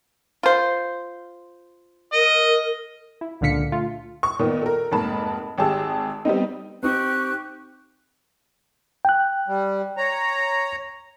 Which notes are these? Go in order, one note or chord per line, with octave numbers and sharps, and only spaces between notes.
F4 C5
A#4 D#5
E4
C#2 A#2 D3 F5 B6 C#7
A3 F4
C#6
A#2 D#3 B3
A4 A#4
F1 G#2 A#3 A5 B5
G#1 G4 G#4 A5 E6
G3 B3 C4 D#4
C4 D#4 G4 C#6 F#6
G5 F#6
G3
C#5 A#5